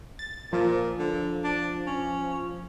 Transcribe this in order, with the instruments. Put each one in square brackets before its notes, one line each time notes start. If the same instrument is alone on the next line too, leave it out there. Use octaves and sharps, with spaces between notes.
[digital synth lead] A6
[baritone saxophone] A#2 [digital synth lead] F3
[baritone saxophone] D3
D4
C#4